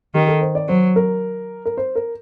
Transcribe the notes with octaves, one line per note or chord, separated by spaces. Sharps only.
D#3 G4
A4
C5
D5
F#3 C5
A#4
A#4
C5
A#4